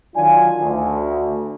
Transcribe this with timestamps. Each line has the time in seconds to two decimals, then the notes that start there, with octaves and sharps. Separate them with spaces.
0.15 D#3 F#3 D4 F4 G#5
0.61 D2